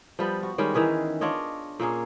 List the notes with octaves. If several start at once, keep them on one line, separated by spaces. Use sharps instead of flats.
F3 G3 B3
F#4
D#3 G3 G#3 C#4
D#3 E3 G#4 B4
D4 F4 C#5 D#5
A#2 A#3 C#4 G#4